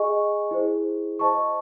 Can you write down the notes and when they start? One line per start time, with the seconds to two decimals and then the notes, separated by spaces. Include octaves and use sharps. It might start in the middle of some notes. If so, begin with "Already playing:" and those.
Already playing: G#4 D#5 G#5 C#6
0.51 E4 G#4 C5
1.19 C5 D#5 A5 C#6